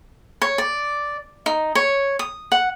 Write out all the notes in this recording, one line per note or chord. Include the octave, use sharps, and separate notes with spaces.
C#5
D5
D#4
C#5
D#6
F#5